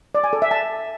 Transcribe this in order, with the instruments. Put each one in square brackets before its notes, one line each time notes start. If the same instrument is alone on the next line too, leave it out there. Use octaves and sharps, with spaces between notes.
[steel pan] D5
G#5
A4
E5
A5